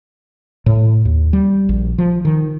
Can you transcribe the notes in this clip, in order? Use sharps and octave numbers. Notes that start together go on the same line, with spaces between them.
A2
D#2
G3
A#1
F3
D#3